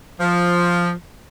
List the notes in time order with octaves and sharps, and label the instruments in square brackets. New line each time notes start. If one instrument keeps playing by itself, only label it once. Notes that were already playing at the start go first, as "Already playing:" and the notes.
[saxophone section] F3